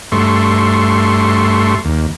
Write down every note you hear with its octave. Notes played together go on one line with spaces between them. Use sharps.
G2 A3 C6 C#6
D#2